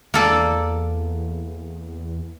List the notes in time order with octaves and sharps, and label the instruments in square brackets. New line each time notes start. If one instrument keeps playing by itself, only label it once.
[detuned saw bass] E2 [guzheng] A#3 A4 D5